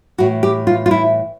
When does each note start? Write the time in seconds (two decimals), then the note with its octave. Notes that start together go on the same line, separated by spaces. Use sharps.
0.18 A2 E3 F#4
0.43 G4
0.67 F4
0.86 F4
0.91 E4